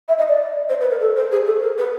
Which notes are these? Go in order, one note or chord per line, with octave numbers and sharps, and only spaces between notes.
E5
D#5
D5
C5
B4
A#4
A4
C5
G#4
A4
A#4
B4